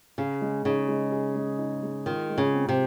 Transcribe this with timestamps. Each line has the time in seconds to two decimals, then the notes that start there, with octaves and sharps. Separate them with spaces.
0.18 C#3 G#4
0.42 G#3
0.65 C#3 D#4
0.88 G#3
1.12 G#4
1.36 G#3
1.59 D#4
1.83 G#3
2.06 D#3 F4
2.30 G#3
2.38 C#3
2.53 C4
2.69 C3